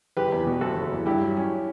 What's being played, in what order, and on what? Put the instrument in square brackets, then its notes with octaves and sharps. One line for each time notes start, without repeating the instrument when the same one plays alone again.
[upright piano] F#1 [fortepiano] G4 B4
[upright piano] E2
B2
[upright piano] F#1 [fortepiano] F#4 A4
[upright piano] F#1
E2
[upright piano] G2 [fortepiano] E4 G4
[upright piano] F#3
C#4